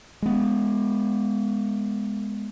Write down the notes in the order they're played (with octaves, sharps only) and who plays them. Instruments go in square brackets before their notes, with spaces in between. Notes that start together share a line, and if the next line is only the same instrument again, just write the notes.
[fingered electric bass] G#3 B3